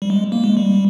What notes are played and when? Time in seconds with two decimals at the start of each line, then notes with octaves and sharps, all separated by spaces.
0.02 G3
0.10 G#3
0.32 A#3
0.44 G#3
0.57 G3